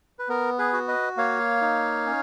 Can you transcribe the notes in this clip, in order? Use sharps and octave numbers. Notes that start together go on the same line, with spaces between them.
B4
B3 A#4
G#4 B4
F#4
B4 D#5
A#3 C#5 F5
D#4
C#4